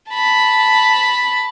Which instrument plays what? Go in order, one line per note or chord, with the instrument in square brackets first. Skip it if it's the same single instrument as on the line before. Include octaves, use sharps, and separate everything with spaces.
[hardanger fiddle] A5 B5